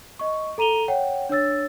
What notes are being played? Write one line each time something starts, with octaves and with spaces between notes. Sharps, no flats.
D#5 C#6
A4 A#5 D#7 F7 G7
C#5 F#5 G5
D4 C#5 E6 A6